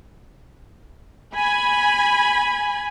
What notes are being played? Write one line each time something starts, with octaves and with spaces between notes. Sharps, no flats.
G#5 B5